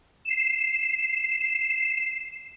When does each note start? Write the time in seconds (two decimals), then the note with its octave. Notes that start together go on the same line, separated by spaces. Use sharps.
0.25 C7 E7